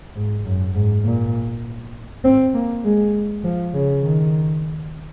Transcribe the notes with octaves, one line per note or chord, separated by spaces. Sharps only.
G#2
F#2
G#2
A#2
C4
A#3
G#3
F3
C#3
D#3